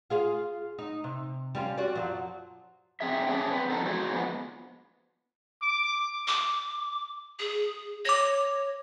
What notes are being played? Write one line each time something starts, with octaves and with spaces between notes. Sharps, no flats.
F4 G#4 F5
D#4
C3
G3 C#4 F4
F#4 G4 D5
F#2 F3 F#3
C4 G#4 E5
C#4 D4 G#4 C#5 E5 G5
C4 B4
D3 F3 G3 B3 D#4 A4
F#4 G#4 C5
D3 F3 G#3 B3
D6
D6
G#4
C#5 D6 A#6